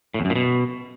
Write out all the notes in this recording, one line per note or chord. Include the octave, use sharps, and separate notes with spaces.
A2
E2
F#2
A#2
B2